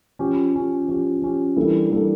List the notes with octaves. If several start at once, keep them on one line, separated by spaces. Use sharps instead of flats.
F3 C#4 G4
F3 C#4 G4
F3 C#4 G4
F3 C#4 G4
E3 G3 A#3 D4 A4
E3 G3 A#3 D4 A4